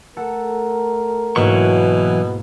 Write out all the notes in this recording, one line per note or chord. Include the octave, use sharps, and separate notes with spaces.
A3 A4 A#4 F#5
E1 G#2 B2 E3 F#3 A#3 C#6